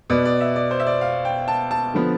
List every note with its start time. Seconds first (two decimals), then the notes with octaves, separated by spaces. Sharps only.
0.10 B2 B3 D5
0.25 D5
0.41 E5
0.56 D5
0.71 C5
0.80 E5
0.87 D5
1.01 F5
1.25 G5
1.48 A5
1.71 A5
1.94 D3 F3 B3